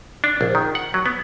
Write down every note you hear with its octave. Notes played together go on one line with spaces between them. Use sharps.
D4
A#1
D#3
F#5
F#3
B3